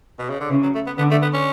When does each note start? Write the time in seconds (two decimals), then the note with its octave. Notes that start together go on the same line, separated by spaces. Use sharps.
0.19 B2
0.29 C#3
0.40 D3
0.49 C#3 E3
0.62 F#3
0.75 A3
0.87 B3
0.98 D3 B3
1.11 A3
1.22 B3
1.33 C#4